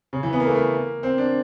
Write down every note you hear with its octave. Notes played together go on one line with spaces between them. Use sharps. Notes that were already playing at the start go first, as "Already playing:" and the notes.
C#3
E3
B3
A#3
A3
A#3
C4
D4